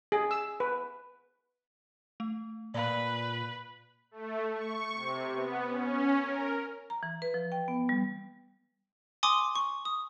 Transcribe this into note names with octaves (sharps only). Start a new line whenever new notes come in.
G#4
E6
B4
A3
A#2 B4 D5 F5
A3
C#6
C3
B3
C#4
A#4
A#5
E3
B4
F3
G5
B3
G3
G#5 C6 D6 D#6
C#6
D#6